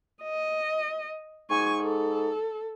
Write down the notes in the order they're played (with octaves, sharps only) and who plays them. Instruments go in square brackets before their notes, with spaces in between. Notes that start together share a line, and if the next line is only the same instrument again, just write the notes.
[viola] D#5
[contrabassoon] G#2 [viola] G#5 C#6
[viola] A4